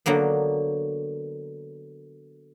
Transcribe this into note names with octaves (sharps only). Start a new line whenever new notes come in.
D3 F#3 A#3 B3